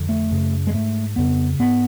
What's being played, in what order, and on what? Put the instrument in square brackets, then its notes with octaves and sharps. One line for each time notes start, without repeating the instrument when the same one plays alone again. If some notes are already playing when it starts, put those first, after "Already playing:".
Already playing: [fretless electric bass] F2 D3
A3
F#2 C#3
G#3
G#2 A3
F2 C#3 B3
G#2 B3